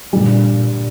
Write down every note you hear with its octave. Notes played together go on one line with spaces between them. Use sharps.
G2 A#2 D3 G3